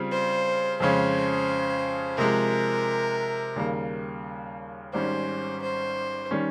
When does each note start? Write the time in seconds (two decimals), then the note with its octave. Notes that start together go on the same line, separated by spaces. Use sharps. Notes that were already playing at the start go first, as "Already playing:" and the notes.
Already playing: C#3 G3 C4 F4
0.12 C5
0.80 F2 C#3 G#3 C#4 C5
2.18 C3 F3 G#3 A#4
3.56 D#2 C#3 G3 A#3
4.93 G#1 G#2 G3 C#4 C5
5.62 C5
6.31 D#3 G3 C#4